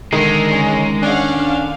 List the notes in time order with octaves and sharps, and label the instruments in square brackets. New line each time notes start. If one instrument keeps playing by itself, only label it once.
[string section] D3 A#4 [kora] D#3 [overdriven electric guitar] G#3
[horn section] C#4
[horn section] C#4 D4 [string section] F5 F#5
[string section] D3 F5